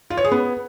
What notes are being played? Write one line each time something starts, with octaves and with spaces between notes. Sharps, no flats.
F4
C#5
G#4
B3